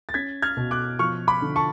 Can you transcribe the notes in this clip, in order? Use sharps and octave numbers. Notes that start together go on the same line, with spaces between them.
A6
C#4 G#6 B6
F6 G#6
B2
D6 F#6
F3 C#6 F6
B5 D6
D3
A5 C#6